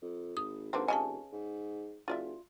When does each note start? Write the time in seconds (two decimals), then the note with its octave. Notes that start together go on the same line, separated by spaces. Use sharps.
0.02 F2
0.37 G#1 D#6
0.73 G#1 D3 A#3 C4 B4
0.88 F1 C#3 D#5 G#5 A5
1.33 G#2
2.08 F#1 F4 D5 E5